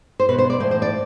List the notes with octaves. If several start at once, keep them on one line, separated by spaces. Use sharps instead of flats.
C5
B2 B4
C5
D5
A2 E3 C5
C5
D5